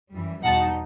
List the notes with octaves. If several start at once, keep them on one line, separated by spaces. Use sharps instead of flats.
F#2 E3 G3
E2 B2 G3 D#4 F#5 A5